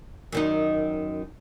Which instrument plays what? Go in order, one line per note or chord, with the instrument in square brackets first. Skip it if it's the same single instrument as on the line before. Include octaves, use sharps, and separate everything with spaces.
[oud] F#2 D#3 D#4